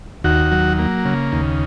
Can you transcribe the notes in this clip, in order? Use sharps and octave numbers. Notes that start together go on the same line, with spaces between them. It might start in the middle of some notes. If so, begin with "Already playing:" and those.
D#2 F#4
F#3
A#3
C#3
D#2